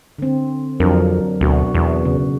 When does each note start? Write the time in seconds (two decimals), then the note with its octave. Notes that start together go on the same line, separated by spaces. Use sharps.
0.19 D3 C4
0.80 F2 F#3 D4 A#4
1.41 D2 B2 D4 F#4
1.74 E2
2.05 C#3